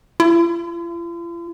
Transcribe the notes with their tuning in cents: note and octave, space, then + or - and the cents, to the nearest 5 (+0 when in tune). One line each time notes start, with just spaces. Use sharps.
F4 -45